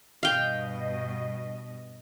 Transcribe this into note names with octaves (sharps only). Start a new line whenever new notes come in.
G2 B2 D#5 F5 G5